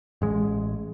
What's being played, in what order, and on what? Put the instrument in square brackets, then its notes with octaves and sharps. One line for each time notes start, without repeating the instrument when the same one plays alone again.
[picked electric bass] A1 G#3